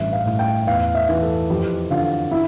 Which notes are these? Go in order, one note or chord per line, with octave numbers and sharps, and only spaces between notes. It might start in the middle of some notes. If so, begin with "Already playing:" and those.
Already playing: A1 G2 E5
F5
A2
G5
E2 F5
E5
E3
A4
F2 G4
D3 F4
E4